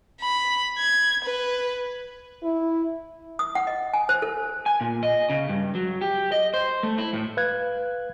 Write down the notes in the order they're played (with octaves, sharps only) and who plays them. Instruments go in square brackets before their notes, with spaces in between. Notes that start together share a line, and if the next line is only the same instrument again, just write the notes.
[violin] B5
G#6
B4
[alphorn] E4
[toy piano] D#6
F#5
D#5
G#5
C5
A4
[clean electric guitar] G#5
A#2
D#5
C#3
G2
F#3
G4
D#5
C5
A3
E4
A2
[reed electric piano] B4 F5 F#6 G#6